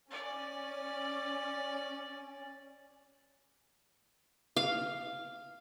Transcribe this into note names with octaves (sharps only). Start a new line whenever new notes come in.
C#4 D5
F5